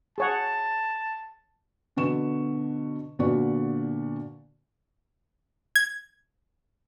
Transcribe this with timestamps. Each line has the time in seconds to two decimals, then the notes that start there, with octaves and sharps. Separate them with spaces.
0.18 G#4 C#5 F#5 A5
1.96 B2 D3 B3 C#6 E7
3.19 A#2 D3 B3 F#4 D5 C#6
5.75 G#6